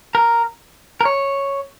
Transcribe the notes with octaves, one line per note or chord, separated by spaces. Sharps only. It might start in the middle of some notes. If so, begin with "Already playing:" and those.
A#4
A#4
C#5